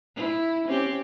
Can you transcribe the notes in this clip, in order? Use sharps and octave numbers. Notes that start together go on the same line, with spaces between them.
E4
C4 C#4 G4